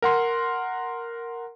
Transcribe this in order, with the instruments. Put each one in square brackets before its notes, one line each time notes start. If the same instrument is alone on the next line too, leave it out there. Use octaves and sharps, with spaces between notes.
[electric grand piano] A#4 F#5 C6